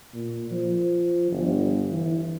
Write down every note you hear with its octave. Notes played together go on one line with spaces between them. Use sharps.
A#2
F3
G1
E3